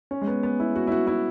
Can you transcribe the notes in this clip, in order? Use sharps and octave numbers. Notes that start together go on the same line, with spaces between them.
C#4
G#3
B3
B3
E4
F#4
E4
F#4
E4